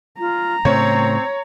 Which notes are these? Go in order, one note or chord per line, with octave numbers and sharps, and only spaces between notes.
F4 A#5
A2 C#3 A3 C4 C#5